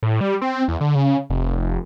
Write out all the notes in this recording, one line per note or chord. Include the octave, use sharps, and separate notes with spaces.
A2
G3
C4
E2
D3
C#3
F1
F1